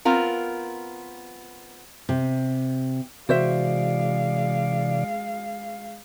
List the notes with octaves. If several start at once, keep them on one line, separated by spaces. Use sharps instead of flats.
B3 C4 F4 A#4
C3
C3 E3 G#3 F#4 C5 D5 E5 F5